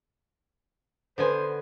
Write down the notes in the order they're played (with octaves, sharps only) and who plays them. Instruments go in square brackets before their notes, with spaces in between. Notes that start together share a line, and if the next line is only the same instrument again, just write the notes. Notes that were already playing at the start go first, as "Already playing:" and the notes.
[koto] D3 B3 G#5 [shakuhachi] C5